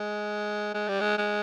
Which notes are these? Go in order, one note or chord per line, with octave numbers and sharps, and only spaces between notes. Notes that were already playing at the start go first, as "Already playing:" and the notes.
Already playing: G#3
G#3
G3
G#3
G#3